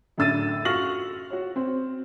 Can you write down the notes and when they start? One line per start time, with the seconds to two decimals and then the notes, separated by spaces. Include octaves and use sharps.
0.18 F#2 A2 D3 E6 A6 D#7
0.65 F4 F#4 C#6 F6 A#6 F#7
1.31 F#4 C#5
1.56 C4